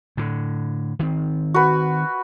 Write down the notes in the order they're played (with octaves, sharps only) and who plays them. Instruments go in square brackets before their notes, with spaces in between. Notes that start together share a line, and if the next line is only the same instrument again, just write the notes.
[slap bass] A2 D3
D#3 C4
[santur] F#4 B4